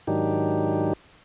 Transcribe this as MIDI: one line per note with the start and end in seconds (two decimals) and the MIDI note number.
0.07 0.93 44
0.07 0.93 51
0.07 0.93 54
0.07 0.93 62
0.07 0.93 63
0.07 0.93 67